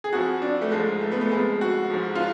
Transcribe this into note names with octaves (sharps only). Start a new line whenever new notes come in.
G#4
F2 F3 F#4
D4
A3
G#2 F3 G#3
A3
B3
A3
F2 F3 G#3
F#4
G#2 F3
F4